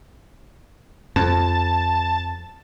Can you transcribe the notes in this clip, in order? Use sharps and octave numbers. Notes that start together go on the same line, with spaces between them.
F2 A5